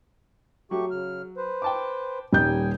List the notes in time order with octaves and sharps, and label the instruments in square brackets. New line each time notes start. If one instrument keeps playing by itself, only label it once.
[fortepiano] F#3 [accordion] A3 G4 C#6
[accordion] C#3 F6
B4 C5
[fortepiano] G5 A5 D6
[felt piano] D#1 D#4 G6 [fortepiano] G3 [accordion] G5 G#5